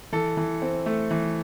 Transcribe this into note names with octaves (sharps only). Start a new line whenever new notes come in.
E3 A4
E3
C4
A3
E3